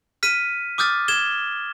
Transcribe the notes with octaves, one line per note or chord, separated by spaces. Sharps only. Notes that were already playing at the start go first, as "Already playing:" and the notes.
F6 B6 D#7
D6 D#6 F6 G6 A6
G#6 E7 G7